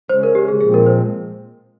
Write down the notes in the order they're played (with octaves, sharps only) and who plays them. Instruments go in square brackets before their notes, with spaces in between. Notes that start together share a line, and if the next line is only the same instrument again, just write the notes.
[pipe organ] C#3 G#3 C#4 [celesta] C5
[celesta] A#4
G4
G#4
[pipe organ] A#2 F3 G#3 C4 [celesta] G#4
[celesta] A#4
C5